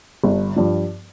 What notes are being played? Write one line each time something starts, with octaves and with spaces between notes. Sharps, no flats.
G1
G2 F3